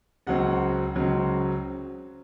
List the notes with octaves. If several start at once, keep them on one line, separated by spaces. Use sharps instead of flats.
C#2 C#3 F#3 C4 F#5
C#2 C#3 F#3 C4